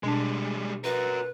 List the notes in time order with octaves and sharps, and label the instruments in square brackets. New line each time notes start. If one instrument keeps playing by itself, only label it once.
[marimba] B2 D4 A5 [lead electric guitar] G3 G#3
[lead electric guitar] F#4 A#4 [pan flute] B4